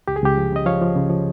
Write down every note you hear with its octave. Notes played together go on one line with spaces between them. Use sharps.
C#2 G4
G#4
C#2 G4
F3
C#3 D#5
F3 C#5 F5
F3
C#3
F3